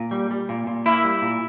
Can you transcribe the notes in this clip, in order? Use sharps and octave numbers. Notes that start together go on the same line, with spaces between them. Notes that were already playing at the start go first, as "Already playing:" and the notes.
Already playing: A#2
G3
G3
A#2
A#2
A#3 E4
G3
A#2